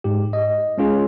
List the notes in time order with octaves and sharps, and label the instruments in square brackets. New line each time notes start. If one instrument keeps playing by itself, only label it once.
[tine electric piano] G#2 G4
D#5
G#3 C#4 F4 G#4